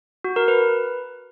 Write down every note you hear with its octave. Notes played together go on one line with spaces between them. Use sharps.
F#4
A#4
B4